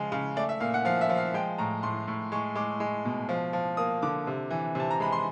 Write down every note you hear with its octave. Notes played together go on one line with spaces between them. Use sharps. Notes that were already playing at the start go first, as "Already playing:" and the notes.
Already playing: C#3 F3 G#3
C#3
A3 D5
E5
A#2 F5
F#5
F3 F5
E5
F3
F5
G#3 G5
A2 A#5
A2 C6
A2
G#3 C#6
G#3 D6
G#3
B2
F3
F3
A#3 D#6
D3 D6
C3
E3
C3 A5
A#5
G#3 B5
C6